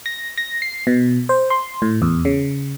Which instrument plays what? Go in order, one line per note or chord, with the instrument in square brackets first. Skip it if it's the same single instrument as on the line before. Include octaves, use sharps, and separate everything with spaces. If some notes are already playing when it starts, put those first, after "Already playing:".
[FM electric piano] A#6
A#6
C7
B2
C5
C6
A2
E2
C#3